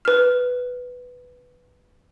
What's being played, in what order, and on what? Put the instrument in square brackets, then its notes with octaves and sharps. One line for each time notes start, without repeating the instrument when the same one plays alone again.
[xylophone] B4 F6